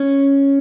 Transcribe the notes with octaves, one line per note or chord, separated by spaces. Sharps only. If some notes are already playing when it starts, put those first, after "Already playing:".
Already playing: C#4